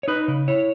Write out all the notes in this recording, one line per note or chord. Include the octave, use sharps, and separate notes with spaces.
C#5
D#4 B4
C#3
E4 C#5